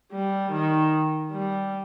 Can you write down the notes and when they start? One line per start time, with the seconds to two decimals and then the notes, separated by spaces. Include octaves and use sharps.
0.12 G3
0.52 D#3
1.31 G3